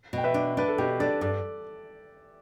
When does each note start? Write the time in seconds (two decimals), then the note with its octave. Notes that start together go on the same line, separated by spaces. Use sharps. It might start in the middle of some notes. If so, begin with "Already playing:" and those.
0.13 B2 G5
0.24 B4 E5
0.34 D4
0.57 D4 B4
0.68 A4
0.78 B2 G4
1.00 D4 A4 D5
1.21 G2 A4 D5